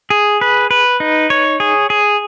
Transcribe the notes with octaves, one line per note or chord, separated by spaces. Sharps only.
G#4
B4
B4
D#4
C#5
G#4
G#4